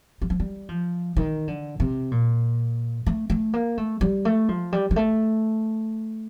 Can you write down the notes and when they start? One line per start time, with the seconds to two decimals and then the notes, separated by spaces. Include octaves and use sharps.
0.21 G3
0.30 F3
0.40 G3
0.69 F3
1.17 D#3
1.48 D3
1.80 C3
2.11 A#2
3.06 A3
3.30 A3
3.53 A#3
3.78 A3
4.01 G3
4.25 A3
4.49 F3
4.72 G3
4.91 G3
4.96 A3